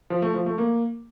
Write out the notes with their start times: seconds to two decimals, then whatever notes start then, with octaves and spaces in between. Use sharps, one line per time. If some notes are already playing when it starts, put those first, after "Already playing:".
0.10 F3
0.22 A3
0.34 F3
0.46 A3
0.58 A#3